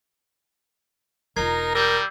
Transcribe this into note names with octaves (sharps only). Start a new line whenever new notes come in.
E1 D#4 F4 A#4 G#6 C7
G3 A#4 E6 G6